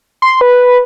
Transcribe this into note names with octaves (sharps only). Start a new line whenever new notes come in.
C6
B4